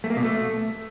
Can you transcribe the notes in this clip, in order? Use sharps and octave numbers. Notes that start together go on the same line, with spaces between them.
A3
A#3
B2
A3